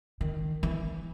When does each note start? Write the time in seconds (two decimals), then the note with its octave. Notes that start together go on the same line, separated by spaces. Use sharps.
0.21 D#3
0.63 E3